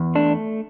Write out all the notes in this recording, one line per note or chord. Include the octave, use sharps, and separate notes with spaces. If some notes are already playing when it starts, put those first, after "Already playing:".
Already playing: E2
A3 D4